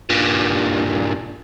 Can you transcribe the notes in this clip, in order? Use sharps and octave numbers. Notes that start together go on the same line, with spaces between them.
G2 A#2